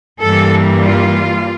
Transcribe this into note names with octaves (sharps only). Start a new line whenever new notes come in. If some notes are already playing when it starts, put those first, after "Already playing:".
G2 E3 G3 A#3 A4
F4